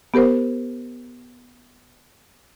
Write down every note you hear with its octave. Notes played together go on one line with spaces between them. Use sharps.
B3 G4 A#4 C5